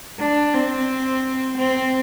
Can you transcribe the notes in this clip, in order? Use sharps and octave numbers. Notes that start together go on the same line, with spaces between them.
D4
C4
C4